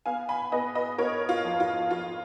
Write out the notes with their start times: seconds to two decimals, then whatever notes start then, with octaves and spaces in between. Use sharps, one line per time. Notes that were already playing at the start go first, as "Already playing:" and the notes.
0.06 B3 F5 G#5
0.29 G#5 B5
0.52 B3 B4 D#5
0.75 B4 D#5
0.98 B3 A#4 C#5
1.29 F4
1.44 F2
1.60 F4
1.91 F2 F4